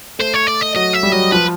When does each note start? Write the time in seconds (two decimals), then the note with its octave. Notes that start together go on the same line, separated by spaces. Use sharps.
0.19 A3 C5
0.34 C#5
0.47 D5
0.61 D#5
0.76 F#3 D#5
0.94 E5
1.03 G3
1.13 F#3 D#5
1.32 F3 B4